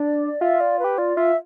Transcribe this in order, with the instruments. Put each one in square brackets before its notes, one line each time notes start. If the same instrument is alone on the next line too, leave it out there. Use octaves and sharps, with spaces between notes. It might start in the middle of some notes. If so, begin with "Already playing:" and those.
Already playing: [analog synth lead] D4 [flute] D5
[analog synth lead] F4 [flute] E5
[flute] D5
B4
[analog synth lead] G4
[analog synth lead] F4 [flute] D5
[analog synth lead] F4 [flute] E5